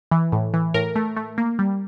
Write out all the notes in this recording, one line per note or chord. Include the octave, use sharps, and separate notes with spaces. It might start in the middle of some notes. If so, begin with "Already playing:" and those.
E3
A2
E3
A2 A#4
A3
A3
A#3
G3